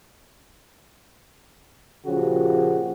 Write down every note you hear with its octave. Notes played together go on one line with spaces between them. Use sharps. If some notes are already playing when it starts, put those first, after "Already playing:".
A#2 C#3 F3 F#4 G4